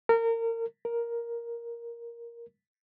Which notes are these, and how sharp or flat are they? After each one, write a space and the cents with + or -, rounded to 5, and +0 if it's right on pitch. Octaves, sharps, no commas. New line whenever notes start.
A#4 -30
A#4 +5